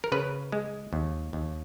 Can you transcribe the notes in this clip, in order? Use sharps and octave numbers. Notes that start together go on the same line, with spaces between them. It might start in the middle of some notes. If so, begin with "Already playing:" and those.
A#4
C#3 B4
G#3
D#2
D#2